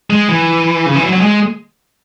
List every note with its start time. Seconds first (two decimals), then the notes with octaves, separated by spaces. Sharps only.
0.10 G#3
0.29 E3
0.86 C#3
0.95 E3
1.02 F#3
1.13 F#3
1.21 G#3